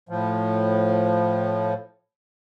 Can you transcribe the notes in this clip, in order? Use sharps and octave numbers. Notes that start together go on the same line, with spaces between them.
A2 F3